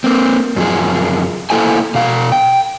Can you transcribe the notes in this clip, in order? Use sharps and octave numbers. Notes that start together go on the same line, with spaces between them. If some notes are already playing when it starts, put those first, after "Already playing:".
A#3 C4
F#2 F3 G#4
A#3 E4 A4 C5 G5 G#5
B2 F5
G5